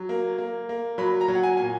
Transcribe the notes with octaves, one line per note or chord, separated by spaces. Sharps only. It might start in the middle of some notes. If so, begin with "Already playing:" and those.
Already playing: F#3
A#3
A#3
A#3
F#3 B5
A#5
F#3
F#5
G#5
A#2 G#5